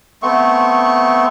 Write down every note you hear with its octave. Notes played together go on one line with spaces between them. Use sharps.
A3 B3 C4 C#6